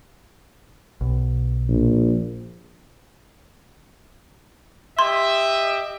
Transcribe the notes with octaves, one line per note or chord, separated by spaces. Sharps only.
B1
A#1
G4 D#5 E5 C6